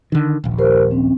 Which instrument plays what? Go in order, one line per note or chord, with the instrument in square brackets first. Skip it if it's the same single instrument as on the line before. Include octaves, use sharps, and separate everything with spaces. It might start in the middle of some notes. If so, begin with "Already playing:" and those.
[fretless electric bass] D3 D#3
D#1 A#1
[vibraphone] G4 A#4 C5
C4 C#4